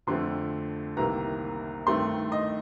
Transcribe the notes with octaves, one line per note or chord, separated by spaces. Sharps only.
F2 D3 F3 A3 C4 C6
C2 C3 D#3 A#3 A#5
G2 D#3 A3 C4 C6
D#5